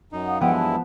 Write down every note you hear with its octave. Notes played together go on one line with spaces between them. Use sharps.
F#2 D#4
F5 F#5 D#6
G2 F3 G#3 B3 E4 F#5 G5 D6
A5